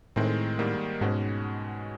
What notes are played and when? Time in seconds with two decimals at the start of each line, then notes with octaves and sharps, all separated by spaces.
0.16 A2 D#3 G#3 C4
0.59 G#2 D#3 G3 A#3
1.01 G#2 B2 G#3 C#4 F#4